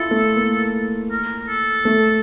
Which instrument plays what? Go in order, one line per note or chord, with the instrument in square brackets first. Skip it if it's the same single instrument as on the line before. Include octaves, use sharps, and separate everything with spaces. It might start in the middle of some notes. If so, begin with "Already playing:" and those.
Already playing: [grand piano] E4 F4 [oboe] A4
[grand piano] A3
A#3
[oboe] A#4
A4
[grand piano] A3